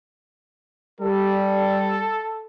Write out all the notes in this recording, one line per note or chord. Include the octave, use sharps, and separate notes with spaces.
G3 A4